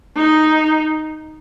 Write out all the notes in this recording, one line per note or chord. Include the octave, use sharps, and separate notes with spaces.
D#4